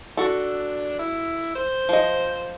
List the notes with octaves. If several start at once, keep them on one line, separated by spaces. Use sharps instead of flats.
D4 F#4 A4
E4
C5
F3 D#5